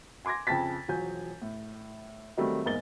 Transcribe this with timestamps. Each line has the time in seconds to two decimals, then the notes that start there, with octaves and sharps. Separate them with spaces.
0.25 G#5 C6 D6 G#6 A#6
0.47 F2 C#3 A5 A6 B6
0.88 E1 F3 F#3 G#5 G6
1.42 A2
2.37 D#3 F#3 G3 A3 C4
2.66 E2 G#2 A#3 D#4 A6 G7